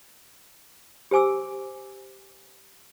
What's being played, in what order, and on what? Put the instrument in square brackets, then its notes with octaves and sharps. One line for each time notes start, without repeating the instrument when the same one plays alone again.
[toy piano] G4 C5 G#5 D6 E6